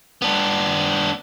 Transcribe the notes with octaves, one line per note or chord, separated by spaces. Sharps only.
B3 D4